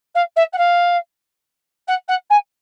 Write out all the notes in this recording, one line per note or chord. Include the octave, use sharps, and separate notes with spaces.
F5
E5
F#5
F5
F#5
F#5
G#5